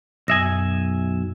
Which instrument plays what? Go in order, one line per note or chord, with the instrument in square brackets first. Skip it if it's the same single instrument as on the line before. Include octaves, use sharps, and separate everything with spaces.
[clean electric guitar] B1 E5 G#5 [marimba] F#2 D#6 A#6